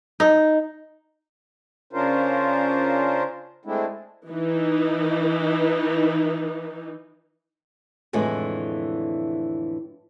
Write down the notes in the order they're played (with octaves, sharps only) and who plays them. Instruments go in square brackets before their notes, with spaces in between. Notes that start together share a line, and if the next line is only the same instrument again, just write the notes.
[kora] D#4
[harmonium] C#3 C#4 D4 F4 A#4 C5
G#3 A3 C4 D4 E4
[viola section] E3 D#4
[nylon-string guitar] F2 A2 D3 E3 G#3